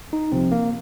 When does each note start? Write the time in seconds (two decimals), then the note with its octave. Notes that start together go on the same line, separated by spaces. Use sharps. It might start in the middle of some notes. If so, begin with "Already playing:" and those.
0.13 D#4
0.32 C2 C3 F3 C4
0.52 A#3